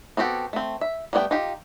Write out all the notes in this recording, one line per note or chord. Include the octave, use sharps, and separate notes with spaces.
B3 C4 F#4 G4 A4
A3 C4
E5
G3 A3 B3 C#5 G5
D#4 F4 G4